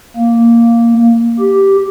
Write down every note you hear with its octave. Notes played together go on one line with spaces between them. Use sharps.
A#3
G4